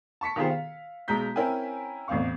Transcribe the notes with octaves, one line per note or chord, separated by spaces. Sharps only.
A5 C#6 B6 C#7
D#3 B3 F4 G4 G#4 C5
F5
B1 G#3 A#5 G6 B6
C4 C#4 E4 A#4 G5 G#5
A1 E2 C4 F5 C#6